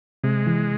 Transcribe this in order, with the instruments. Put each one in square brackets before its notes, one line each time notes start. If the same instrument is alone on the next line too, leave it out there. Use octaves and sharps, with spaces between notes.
[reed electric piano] C3 [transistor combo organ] G#3
[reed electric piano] E3